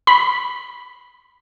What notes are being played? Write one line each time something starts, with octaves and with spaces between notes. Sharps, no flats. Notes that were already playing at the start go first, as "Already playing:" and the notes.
B5